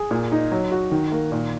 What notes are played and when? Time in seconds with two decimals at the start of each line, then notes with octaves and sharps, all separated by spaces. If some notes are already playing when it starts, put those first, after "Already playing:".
Already playing: G#4
0.11 A#2
0.32 D#4
0.51 F#3
0.72 F#4
0.91 D#3
1.12 A#3
1.32 A#2